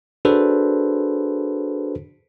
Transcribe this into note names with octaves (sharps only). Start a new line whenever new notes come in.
D4 F#4 G#4 A4 B4 C5